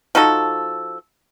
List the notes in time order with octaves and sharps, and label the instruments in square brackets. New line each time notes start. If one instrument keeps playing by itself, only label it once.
[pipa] F3 D#4 F#4 A4